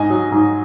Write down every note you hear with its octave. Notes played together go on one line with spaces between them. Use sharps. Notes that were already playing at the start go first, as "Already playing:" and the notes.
Already playing: G#2 D#5 G#5
F#3
G#2